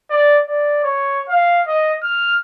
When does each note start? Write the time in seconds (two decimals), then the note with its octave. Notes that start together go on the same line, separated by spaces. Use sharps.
0.10 D5
0.48 D5
0.84 C#5
1.29 F5
1.67 D#5
2.03 F6